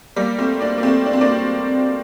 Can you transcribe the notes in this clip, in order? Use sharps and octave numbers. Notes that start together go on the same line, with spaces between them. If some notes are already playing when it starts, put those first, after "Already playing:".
G3 A#3
A3 C4
A#3 D4
A#3
A3 C4
D4
C4
A#3 D4